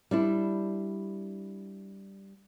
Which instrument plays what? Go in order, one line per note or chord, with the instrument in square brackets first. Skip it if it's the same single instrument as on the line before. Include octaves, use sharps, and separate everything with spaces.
[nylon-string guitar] G3 D4 E4